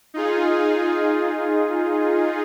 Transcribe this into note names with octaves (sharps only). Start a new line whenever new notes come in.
D#4 F4 G#4